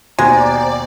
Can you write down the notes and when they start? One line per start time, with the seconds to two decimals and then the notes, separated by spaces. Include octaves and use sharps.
0.19 D#2 B2 G#3 C5 D5 A#5